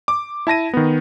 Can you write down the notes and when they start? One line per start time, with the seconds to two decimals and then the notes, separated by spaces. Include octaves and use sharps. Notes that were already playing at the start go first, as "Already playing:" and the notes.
0.08 D6
0.47 E4 A5 A#6 D#7
0.73 D#3 B3